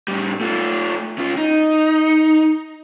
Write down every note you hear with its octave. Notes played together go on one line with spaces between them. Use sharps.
A2 G3
A3 F4
C#3 F4
D#4